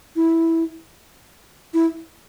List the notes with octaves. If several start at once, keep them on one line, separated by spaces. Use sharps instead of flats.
E4
E4